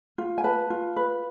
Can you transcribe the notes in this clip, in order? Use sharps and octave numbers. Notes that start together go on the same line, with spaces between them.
F4
G#5
B4 A5
F4
B4